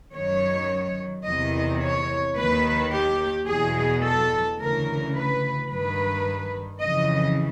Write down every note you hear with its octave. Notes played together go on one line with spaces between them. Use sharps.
F#2 D#3 C#5
E2 C3 D#3 D#5
C#5
D#2 D#3 B4
G4
E2 B2 G#4
A4
D2 C#3 E3 A#4
B4
G2 D#3 B4
F2 C#3 E3 D#5